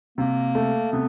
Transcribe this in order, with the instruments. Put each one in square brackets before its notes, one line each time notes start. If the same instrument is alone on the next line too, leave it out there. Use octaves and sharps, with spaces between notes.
[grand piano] C3 [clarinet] A#3
[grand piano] A3
[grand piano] C3 [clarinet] B3